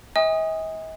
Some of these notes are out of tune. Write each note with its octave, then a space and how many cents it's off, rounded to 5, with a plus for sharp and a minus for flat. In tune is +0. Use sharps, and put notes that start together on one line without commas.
D#5 +45 G#5 -40 D#6 -5